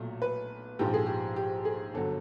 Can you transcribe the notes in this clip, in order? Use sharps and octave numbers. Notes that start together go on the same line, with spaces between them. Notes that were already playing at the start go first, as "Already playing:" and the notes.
Already playing: B1 A#2 F#3 A3
B4
A#1 G#2 F3 G4
G#4
G4
G4
G#4
G1 D3 F#3 A4